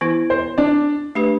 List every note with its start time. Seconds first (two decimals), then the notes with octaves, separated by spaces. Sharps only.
0.01 E3 B3 E4
0.30 C5
0.58 D4 D5
1.15 A3 D4 G4 B4